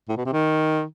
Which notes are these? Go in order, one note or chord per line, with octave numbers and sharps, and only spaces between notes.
A2
B2
C3
D#3